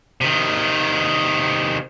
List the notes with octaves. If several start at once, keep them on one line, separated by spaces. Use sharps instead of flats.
C3 D#3